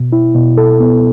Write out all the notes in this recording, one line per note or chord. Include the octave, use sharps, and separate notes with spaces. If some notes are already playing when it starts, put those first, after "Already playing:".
Already playing: B2
E4
B2
A4
B3